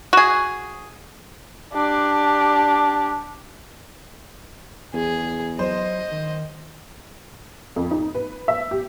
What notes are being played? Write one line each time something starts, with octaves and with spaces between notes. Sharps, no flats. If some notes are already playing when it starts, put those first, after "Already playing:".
F#4 G#4
D4 G4
E2 G#4
F#3 C5 D#5
D#3
F2
D#4
B4
E5
G4